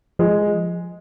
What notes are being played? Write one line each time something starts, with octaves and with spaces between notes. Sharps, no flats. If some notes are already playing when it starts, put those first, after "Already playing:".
F3 G#3